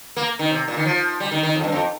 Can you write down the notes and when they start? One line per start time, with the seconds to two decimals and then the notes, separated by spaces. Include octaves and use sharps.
0.16 A#3
0.39 D#3
0.51 C3
0.68 A#2
0.77 D#3
0.86 F3
1.20 G3
1.31 D#3
1.43 D#3
1.55 F2
1.64 G2
1.72 F2